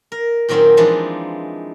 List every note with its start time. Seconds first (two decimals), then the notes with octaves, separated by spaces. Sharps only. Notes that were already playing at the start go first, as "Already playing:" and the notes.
0.12 A#4
0.49 A#2 D#3 F#3 C4 C#4 D#4
0.77 E3 F3 G#3 D4 D#4